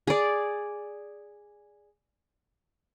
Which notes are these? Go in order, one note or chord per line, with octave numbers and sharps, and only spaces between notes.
G#4 D5